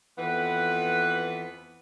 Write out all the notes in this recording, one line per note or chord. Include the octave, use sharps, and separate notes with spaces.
F2 E3 B3 B4